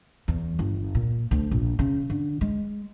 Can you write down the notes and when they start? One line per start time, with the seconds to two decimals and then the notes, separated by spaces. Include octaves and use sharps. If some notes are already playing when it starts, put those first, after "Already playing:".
0.28 E2
0.59 G1
0.95 A#2
1.31 D2
1.51 A#1
1.79 C#3
2.10 D3
2.41 G#3